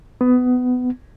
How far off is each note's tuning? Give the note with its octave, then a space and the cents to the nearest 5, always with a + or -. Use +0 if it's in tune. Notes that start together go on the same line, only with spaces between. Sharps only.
B3 +20